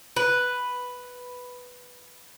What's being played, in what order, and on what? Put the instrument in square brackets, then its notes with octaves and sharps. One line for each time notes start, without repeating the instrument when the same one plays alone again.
[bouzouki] B4